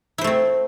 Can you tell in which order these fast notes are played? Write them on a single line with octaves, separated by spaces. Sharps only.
E4 C5 A3 C4